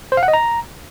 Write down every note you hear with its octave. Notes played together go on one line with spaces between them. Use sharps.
C5
F5
F#5
D#5
A#5